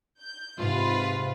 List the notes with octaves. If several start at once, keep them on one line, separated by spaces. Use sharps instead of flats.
G6
G#2 C3 F4 B4